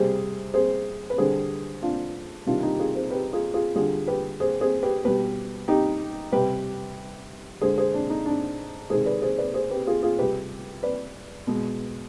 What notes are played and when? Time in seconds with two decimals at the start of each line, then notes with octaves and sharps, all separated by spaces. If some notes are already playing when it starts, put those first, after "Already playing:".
Already playing: C3 G3 G#4 C5
0.54 G#4 C5
1.10 B4
1.18 D3 G3 G#4 C5
1.82 D4 F4
2.46 C3 D#3 G3 D4 F4
2.63 D#4 G4
2.73 G4
2.79 F4 G#4
2.95 G#4 C5
3.11 G4 B4
3.33 F4 G#4
3.54 F4 G#4
3.75 D3 G3 F4 G#4
4.07 G4 B4
4.40 G#4 C5
4.61 G#4 C5
4.83 G4 B4
5.04 B2 G3 G4 B4
5.68 D#4 G4
6.32 C3 G3 G4 B4
7.61 D3 G#3 G#4 C5
7.78 G#4 C5
7.94 D4
8.10 D#4
8.26 D4
8.90 C3 D#3 G#3 G#4 C5
9.06 B4 D5
9.22 G#4 C5
9.38 B4 D5
9.54 G#4 C5
9.70 G4 B4
9.87 F4 G#4
10.03 F4 G#4
10.19 C3 G3 G4 B4
10.83 B4 D5
11.47 B2 G#3